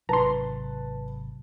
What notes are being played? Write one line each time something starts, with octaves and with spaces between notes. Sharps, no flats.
G#1 C3 F#3 B4 A5 A#5 C6